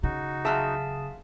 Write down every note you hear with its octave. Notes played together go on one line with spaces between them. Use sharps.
C#3 D#4 F#4
F#3 F4 G#4 E5 A5